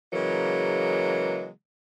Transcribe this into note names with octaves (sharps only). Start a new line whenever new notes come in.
C#3 E3 F#3 G#3 A#3